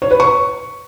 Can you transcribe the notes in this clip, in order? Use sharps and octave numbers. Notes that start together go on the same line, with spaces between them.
C#5
B4
C#6